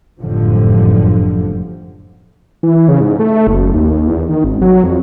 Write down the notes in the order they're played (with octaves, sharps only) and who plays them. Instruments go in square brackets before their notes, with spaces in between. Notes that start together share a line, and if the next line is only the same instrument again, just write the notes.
[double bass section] F#1 F2 A2 D3 F3 G3
[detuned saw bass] E3
C#3
G#2
A3
F#1
D#2
E2
D#3
G#1
F#3
F2